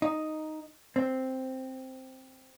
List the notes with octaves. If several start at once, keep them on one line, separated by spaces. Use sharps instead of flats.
D#4
C4